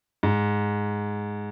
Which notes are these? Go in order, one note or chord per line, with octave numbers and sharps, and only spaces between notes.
G#2